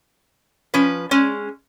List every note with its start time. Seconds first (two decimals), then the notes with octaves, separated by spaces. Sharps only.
0.74 F3 C#4 B4
1.11 G#3 C#4